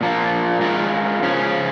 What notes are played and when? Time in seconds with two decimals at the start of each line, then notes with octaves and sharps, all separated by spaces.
0.01 A#2 F3 A#3 F4
0.61 G#3 F4 A#4
1.23 C#3 F3 C#4